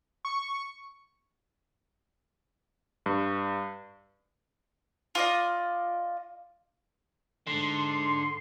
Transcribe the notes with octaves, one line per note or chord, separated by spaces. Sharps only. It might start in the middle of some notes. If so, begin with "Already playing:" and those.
C#6
G2
F4 D5 D#5
G#2 D3 C6